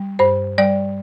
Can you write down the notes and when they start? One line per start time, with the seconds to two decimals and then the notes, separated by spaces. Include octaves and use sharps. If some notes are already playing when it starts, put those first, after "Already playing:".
Already playing: G3
0.19 G2 C5
0.58 G3 D5